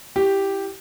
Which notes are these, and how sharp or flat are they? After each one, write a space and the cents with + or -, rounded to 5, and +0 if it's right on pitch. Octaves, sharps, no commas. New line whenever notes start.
E4 +10 G4 +0